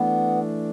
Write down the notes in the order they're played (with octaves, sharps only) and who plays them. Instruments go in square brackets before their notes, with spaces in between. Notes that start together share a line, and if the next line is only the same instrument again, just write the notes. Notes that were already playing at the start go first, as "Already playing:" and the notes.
Already playing: [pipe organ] E3 A3 D4 [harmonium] B3